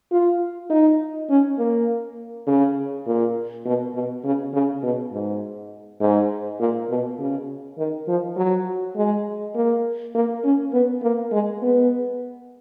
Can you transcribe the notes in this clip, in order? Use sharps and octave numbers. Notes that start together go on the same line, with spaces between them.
F4
D#4
C#4
A#3
C#3
A#2
B2
B2
C#3
C#3
B2
G#2
G#2
A#2
B2
C#3
D#3
F3
F#3
G#3
A#3
A#3
C#4
B3
A#3
G#3
B3